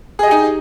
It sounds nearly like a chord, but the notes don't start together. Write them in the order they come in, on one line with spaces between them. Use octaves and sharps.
G#4 D#5 G4 D#4